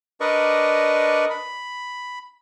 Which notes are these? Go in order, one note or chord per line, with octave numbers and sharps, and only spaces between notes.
D4 A#4 B4 D5 D#5 C#6
B5